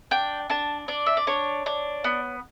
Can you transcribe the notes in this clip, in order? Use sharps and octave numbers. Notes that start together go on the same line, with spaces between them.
D4 G5
D4 A5
D4 D5
E5
D5
D4 C#5
D4
B3